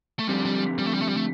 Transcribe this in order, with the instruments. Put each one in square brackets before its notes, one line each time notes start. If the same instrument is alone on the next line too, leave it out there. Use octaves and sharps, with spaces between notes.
[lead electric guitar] A3
[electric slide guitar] D3 F3 C4 G4 [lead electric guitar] G3
[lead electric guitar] G3
G3
A3
G3
A3
G3
A3